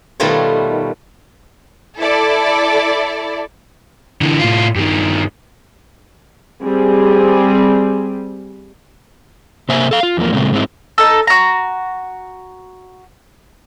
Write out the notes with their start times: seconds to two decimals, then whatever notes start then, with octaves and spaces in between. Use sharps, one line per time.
0.20 B2 D#3 G3 A3 F4 C#5
1.99 E4 A4 D5
4.22 D3 E3
4.40 A2 F4
4.76 G2 D#3
6.63 G3 C4 G#4
9.69 C3 A#3 C5 E5 G#5
9.91 A4 F5
10.03 F4
10.17 E2 F3 A#3
10.32 A#2 C#3 G#3 A3 C4
10.51 G#2 G#3 C4 E4
10.98 D#4 A4
11.27 F#4 A#5